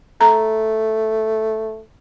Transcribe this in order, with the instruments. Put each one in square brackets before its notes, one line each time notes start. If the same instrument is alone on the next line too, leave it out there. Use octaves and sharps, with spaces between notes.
[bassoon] A3 [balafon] A#5